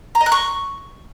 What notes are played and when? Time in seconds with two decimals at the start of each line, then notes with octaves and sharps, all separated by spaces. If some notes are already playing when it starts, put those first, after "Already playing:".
0.15 A#5
0.21 D#5
0.26 F#6
0.32 C#6